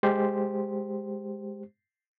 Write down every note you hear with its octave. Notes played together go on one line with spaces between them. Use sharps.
G#3 G4 C5